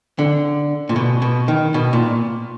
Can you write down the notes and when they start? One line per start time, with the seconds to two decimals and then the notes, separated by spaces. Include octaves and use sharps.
0.19 D3
0.89 A#2
0.96 B2
1.22 B2
1.48 D#3
1.74 B2
1.93 A#2